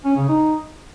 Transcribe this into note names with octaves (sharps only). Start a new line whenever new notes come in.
C#4
C#3
D#4